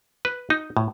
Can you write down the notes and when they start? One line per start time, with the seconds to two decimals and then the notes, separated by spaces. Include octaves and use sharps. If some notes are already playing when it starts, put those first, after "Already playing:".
0.25 B4
0.50 D#4
0.77 A2